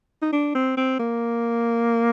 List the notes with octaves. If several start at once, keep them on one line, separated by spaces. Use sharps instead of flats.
D#4
D4
C4
C4
A#3